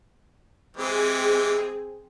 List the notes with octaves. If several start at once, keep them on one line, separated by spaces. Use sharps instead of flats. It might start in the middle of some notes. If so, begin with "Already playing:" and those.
E3 G#3 C4 G4 G#4